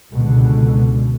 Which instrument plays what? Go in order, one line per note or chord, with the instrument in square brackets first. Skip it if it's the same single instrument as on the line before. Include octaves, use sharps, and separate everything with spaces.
[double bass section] C#2 B2 D3